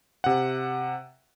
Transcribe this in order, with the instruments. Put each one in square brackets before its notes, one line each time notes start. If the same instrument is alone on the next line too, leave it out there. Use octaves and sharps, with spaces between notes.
[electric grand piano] C3 F#5